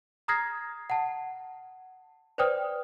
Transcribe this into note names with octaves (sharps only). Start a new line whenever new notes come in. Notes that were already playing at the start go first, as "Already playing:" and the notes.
A#5 D#6 F6 G#6 A#6 C7
F#5 A5
B4 C5 D5 G5 D#6 F6